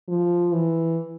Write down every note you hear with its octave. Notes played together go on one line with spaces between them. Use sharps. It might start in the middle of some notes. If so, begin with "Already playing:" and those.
F3
E3